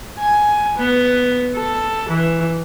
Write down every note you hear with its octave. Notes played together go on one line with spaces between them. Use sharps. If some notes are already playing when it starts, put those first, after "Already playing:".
G#5
B3
A4
E3